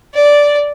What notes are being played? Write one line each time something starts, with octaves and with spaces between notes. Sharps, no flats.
D5